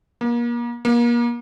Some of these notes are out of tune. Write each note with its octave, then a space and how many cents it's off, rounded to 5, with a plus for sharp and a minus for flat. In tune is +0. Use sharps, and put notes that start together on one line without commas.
A#3 +35
A#3 +35